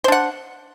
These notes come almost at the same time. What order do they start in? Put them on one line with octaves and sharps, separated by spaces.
C5 D4 F#5